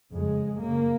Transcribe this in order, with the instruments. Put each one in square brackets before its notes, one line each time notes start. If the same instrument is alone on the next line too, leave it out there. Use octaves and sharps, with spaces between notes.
[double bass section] F2 C#3 G#3
F#2 C#3 A#3